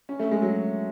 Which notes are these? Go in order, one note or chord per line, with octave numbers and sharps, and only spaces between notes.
C#4
A3
G#3
F#3